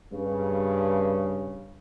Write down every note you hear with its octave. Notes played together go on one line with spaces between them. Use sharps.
G2 C#3